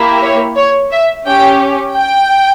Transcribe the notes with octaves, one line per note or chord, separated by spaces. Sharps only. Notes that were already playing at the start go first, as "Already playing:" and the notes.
Already playing: A#3 E4 G4
C#5
C#5
E5
C#4 G4 G5
G5